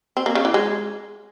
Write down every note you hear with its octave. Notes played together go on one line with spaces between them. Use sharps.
C4
A#3
C#3
E3
G#3